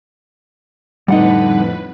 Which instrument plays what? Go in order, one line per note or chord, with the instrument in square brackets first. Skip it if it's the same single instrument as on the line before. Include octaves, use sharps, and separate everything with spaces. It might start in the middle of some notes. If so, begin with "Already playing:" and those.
[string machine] F2 A2 B4 [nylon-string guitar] D3 D#4 [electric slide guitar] G3 F#5